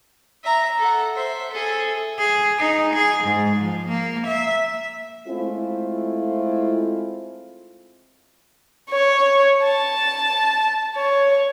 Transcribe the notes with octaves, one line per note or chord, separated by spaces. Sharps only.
E5 A#5
A4 F#5
C5 E5
G#4 A4
G#4
D#4
G#4
G#2
F3
A#3
E5
G#3 A3 C4 E4 F4
C#5
A5
C#5